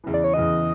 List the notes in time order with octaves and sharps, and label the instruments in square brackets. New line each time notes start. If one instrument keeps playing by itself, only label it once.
[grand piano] E2 C#3 E3
[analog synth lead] D5
C#5
[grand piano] E2 C#3 E3 [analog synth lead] D#5